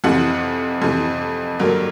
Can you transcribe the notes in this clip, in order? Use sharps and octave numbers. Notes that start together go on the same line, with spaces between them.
F2 C3 E3 F#5
F2 C3 E3
G2 D3 F#3 A#3